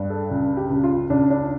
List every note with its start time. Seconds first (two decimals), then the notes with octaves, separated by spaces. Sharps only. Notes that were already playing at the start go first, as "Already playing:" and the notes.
Already playing: G2
0.10 A4
0.31 C#2
0.57 G4
0.70 C#2
0.84 F4
1.10 C#2 D4
1.30 D4